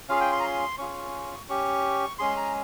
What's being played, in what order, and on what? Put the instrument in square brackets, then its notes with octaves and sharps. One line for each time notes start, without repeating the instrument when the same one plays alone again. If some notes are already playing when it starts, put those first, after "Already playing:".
[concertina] C#4 F4 G#4 F5
G5
C6
A#5
C6
C#4 F4 G#4 C#6
C#4 G4 C#6
G#3 C#4 G#4 C6
A#5